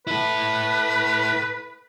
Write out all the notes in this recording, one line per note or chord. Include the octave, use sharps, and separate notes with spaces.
E4 A4 B4